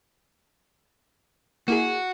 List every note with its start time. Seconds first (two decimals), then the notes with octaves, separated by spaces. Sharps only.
1.68 A#3 E4 F#4 G#4